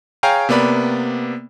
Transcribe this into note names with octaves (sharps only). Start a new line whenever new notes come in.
G#4 C#5 F5 G5 G#5 A#5
C3 A#3 B3 D5 B5